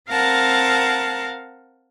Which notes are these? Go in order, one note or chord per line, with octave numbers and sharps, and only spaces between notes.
C4 A#4 F5 F#5 A5